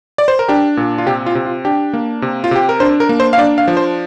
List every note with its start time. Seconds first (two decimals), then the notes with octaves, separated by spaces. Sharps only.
0.18 D5
0.28 C5
0.39 A#4
0.48 D4 G4
0.77 A#2
0.98 F4
1.06 C3 G4
1.26 F4
1.35 C3
1.45 F4
1.65 D4 G4
1.94 A#3
2.22 C3
2.44 F4
2.51 C3 G4
2.69 A#4
2.80 D4 C5
3.00 A#4
3.09 A#3
3.20 C5
3.33 F5
3.38 D4 D5
3.58 F5
3.68 F3
3.77 C5